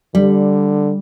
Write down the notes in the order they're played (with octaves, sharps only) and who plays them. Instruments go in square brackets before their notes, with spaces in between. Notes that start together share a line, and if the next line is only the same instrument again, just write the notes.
[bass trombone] D3 [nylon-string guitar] G3